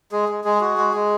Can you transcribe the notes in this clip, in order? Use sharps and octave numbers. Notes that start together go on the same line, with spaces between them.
G#3 G#4
G#3
G#3 G#4
F#4
G#3
G#3